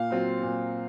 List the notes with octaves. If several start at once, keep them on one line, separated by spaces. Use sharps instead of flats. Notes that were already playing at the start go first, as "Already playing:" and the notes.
Already playing: A#2 F5
F#3 C4 F4
A#2